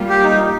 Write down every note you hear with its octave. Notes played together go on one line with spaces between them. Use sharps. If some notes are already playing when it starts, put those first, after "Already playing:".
Already playing: G3 A#3 F4
G4
D#4